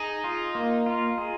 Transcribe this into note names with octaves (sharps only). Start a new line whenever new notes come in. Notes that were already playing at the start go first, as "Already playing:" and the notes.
Already playing: D#4 G#4
F4
A#3
F4
G#4